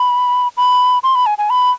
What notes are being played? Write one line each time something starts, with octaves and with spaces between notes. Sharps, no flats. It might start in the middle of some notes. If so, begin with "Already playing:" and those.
Already playing: B5
B5
C6
B5
G#5
G#5
B5